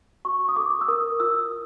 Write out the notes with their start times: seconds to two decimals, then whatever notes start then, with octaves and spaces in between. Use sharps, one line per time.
0.25 F#4 C#6
0.49 D#6
0.56 A4 D6
0.81 E6
0.88 A#4 D#6
1.20 F4 E6